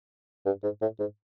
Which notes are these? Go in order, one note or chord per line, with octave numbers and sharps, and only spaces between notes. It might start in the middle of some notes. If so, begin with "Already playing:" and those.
G2
G#2
A2
G#2